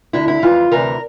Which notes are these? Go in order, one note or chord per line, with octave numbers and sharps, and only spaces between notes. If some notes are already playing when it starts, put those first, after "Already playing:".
D2 D3 E4
E4
F2 E3 F4
D2 C3 E3 A#4